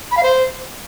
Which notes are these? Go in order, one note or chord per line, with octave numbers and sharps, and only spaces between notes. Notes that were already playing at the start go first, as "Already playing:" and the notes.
B5
F5
C5